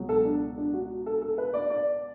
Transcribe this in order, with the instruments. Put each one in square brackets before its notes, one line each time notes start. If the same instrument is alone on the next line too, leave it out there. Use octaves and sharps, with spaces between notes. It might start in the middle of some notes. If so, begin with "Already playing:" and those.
Already playing: [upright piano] C#2 B2 F#3
A4
D4
D4
F#4
A4
A4
B4
D5
D5